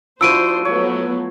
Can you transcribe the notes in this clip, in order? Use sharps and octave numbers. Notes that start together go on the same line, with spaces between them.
F3 D4 E4 F#4 C5 E6 D7 D#7
F#3 A3 B3 C#5